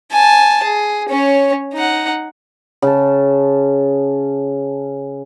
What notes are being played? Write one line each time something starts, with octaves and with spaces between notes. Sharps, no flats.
G#5 A5
G#4
C#4 C#5
D#4 F#5
C#3 A5